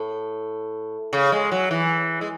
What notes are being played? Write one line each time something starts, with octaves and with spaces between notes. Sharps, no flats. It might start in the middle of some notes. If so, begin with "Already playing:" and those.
Already playing: A2
C#3
G#3
F#3
E3
G#3